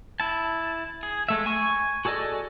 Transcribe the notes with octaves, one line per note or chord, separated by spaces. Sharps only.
E4 A5
G#4
G#3 A3 E5
G#5 C#6
F#4 G#4 A4 D5 D#5